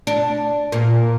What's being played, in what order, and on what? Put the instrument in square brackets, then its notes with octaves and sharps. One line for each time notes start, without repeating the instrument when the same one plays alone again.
[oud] D4
A#2